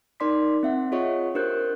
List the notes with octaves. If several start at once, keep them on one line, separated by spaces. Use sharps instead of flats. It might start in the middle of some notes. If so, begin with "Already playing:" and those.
D#4 A#4 D5 C6 D6 B6
C4 E5 F#5
F4 G#4 C#5 D#5 F#5 C#6
D4 G4 A#4 C5 F#6 G6